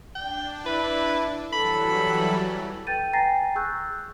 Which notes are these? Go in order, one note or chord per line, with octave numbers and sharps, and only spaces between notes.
D4 G5
E4 B4
E3 F#3 G3 A4 B5
A4 B4 G5 G6 A6 D#7
G5 G#5 A#5 A6 A#6 C7
G#4 C#6 E6 F#6 G6